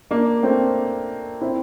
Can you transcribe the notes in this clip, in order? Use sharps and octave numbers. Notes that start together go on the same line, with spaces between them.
A#3 D4
A3 C4
C4 E4